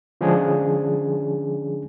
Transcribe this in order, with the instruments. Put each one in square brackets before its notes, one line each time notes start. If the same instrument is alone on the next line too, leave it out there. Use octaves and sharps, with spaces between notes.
[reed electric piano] D3 F3 G#3 C#4 D4 G#4